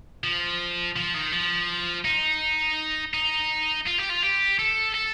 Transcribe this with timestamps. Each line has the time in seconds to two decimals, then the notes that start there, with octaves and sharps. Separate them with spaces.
0.24 F3
0.96 F3
1.14 D#3
1.32 F3
2.05 D#4
3.14 D#4
3.86 F4
3.98 G4
4.09 F4
4.22 G4
4.59 A4
4.95 A4